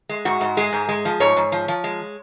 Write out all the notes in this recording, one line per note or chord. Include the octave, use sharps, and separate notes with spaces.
G#3
G#2 F#4
G#2
G#3 G#4
G#2
G#3
F3
G#2 C#5
G#2
F3
F3
G#3